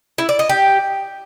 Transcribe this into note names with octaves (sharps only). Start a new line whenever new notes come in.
E4
D5
D#5
G4